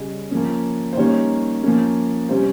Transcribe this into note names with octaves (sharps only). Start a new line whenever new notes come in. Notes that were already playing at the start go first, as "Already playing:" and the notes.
Already playing: C#3 G3 C#4 D#5
F3 A#3 C#4
C5
D#3 G3 A#3 C#4 C#5
F3 A#3 C#4
C3 G3 C#4 C5